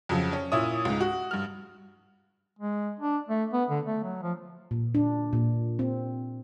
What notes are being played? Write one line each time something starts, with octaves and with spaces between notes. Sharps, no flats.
F2 C#3 F#3
C#4
A#2 E4 C#5 D#6
C#2 G#2
F#4
G2 F6
G#3
D4
A3
B3
D3
A3
F#3
F3
A#2
D4
A#2
C4